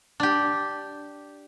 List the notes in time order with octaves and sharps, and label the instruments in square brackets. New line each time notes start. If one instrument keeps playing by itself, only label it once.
[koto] D4 G4